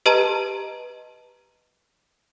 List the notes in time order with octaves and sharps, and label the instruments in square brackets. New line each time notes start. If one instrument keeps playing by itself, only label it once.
[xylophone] G4 B4 D#5 A5 A#5 D#7